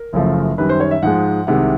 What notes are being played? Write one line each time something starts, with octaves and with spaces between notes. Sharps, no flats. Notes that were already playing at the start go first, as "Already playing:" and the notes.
Already playing: A#4
F#1 F#2 C#3 F3 A3
F#2 D#3 G3 B4
C5
C#5
E5
G#2 F3 G#3 F#5
C2 C3 D#3 G#3 F#5